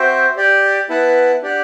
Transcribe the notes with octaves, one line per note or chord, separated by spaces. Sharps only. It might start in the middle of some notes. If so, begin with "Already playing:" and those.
Already playing: C4 F#4 C5 E5 G5
G4 D5 G5
B3 E4 B4 F#5 A5
D4 G4 D5 F#5